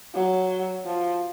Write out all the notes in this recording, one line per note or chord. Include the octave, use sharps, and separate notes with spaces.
F#3
F3